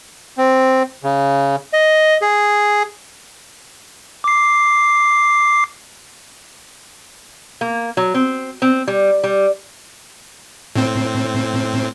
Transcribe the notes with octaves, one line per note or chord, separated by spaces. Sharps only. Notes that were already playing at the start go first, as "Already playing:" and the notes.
C4
C#3
D#5
G#4
D6 C7
A#3
F#3
C4
C4
G3
G3
A2 C4